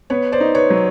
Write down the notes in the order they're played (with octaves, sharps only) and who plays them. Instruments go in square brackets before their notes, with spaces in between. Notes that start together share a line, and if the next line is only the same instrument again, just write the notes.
[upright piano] B3 [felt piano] B4 C#5
[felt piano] C5 D5
[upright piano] D#4
[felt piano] B4 C#5
[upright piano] F#3